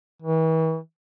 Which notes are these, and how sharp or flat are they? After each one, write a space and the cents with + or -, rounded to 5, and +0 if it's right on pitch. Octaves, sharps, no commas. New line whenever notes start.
E3 -40